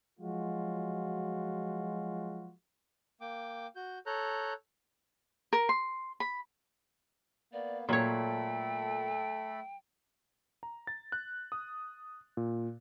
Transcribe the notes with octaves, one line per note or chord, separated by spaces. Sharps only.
F3 F#3 G#3 F4 F#4
A#3 G5 D6
F#4 G6
A4 C#5 A#5 F#6 G6
A#4
C6
B5
A#3 B3 D5
A#2 F#3 A3 A4 C#5 G5 B5
A#5
A6
F#6
D#6
A#2